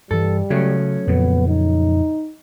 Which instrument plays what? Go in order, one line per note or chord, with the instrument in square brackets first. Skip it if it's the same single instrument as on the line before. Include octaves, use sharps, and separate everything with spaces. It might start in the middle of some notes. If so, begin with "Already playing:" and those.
[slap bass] G2 E3 [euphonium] G3 [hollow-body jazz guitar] A4
[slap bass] C#3 [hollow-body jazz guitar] F#3 A3 C#4
[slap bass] F2 A#2 C#3 [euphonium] B3
[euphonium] D#4